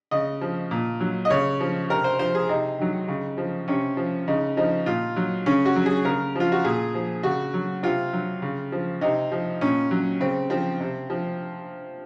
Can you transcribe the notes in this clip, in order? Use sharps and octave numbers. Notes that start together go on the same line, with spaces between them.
C#3 D#5
F3
A#2
F#3
D#5
C#3 C#5
F3
C3 A#4
C5
F3 C5
G#4
C3 D#4
D#3 F#3
C#3
F3
C3 C#4
F3
C#3 D#4
F3 D#4
A#2 F4
F#3
C#3 C#4
F#4
F#3
G#4
C#3 A#4
F3 F4
F#4
A#2 G#4
F3
C#3 F#4
F#3
C3 F4
F#3
C#3
F3
C3 D#4
F3
A#2 C#4
F#3
C#3 C4
F3 C4
C3
F3